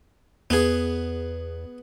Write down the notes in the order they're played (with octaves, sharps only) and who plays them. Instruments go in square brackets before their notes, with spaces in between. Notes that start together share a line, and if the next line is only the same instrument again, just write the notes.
[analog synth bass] E2 [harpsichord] B3 G#4